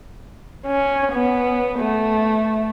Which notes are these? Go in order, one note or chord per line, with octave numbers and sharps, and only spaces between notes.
C#4
B3
A3